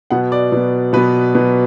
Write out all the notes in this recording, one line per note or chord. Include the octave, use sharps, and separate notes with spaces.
B2 F#3 B3 F#5
D5
B2 F#3 B3
B2 F#3 B3 B4
B2 F#3 B3